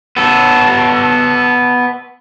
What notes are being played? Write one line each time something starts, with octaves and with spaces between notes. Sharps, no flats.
B3 A4